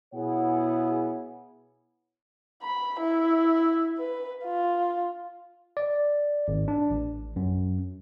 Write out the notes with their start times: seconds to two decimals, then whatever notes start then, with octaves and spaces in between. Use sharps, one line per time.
0.14 B2 B3 E4 G#4 C#5 F#5
2.63 B5
3.00 E4
3.99 B4
4.45 F4
5.77 D5
6.48 G#1
6.68 D4
6.90 A1
7.36 F#2